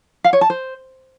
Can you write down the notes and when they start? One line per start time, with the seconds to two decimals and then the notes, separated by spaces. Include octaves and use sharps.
0.24 F5
0.33 C#5
0.41 A5
0.50 C5